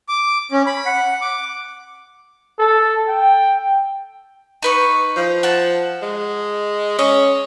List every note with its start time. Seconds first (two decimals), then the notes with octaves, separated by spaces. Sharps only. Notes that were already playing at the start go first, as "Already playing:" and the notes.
0.09 D6
0.52 C#4
0.67 B5
0.86 F#5
1.22 D6
2.59 A4
3.08 G5
4.62 D#4 B4 C#6
5.17 F3
5.43 F#5 A5
6.02 G#3
6.99 C#4 D#5